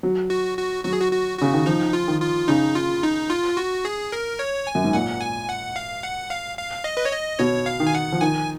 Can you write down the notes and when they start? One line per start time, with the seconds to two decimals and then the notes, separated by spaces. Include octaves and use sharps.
0.03 F#3
0.30 F#4
0.58 F#4
0.84 F#3 F#4
0.93 G#4
1.01 F#4
1.12 F#4
1.39 C#3 F#4
1.53 D#3
1.66 F3 D#4
1.93 F4
2.08 D#3
2.20 F4
2.48 C#3 D#4
2.75 F4
3.03 D#4
3.30 F4
3.57 F#4
3.85 G#4
4.12 A#4
4.39 C#5
4.67 G#5
4.75 F#2
4.84 G#2
4.93 A#2 F#5
5.21 G#5
5.49 F#5
5.76 F5
6.03 F#5
6.30 F5
6.57 F5
6.84 D#5
6.97 B4
7.05 C#5
7.12 D#5
7.39 B2 C#5
7.66 F5
7.80 D#3
7.87 G#5
7.95 F#5
8.12 F3
8.21 D#3 G#5